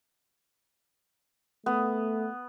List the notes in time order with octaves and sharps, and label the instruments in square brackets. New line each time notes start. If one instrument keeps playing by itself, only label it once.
[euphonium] A3 [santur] B3